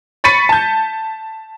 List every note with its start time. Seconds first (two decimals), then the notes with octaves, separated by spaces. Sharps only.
0.24 B5 C#6 A6 B6 C#7 D#7
0.49 A5 G6